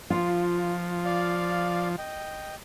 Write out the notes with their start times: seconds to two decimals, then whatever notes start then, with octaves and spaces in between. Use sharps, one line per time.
0.10 F3 F4
1.05 D5 F5
1.98 D#5 G5